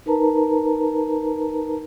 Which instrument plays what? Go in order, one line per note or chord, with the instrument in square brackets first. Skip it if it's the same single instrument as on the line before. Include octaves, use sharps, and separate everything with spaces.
[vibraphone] D#4 A#4 B4 A5 A#5